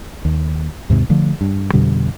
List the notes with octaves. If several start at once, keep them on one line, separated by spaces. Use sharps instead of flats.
D#2
D#2 G#2 C3
D3 F3 A3
G2
F2 B2 D3 G3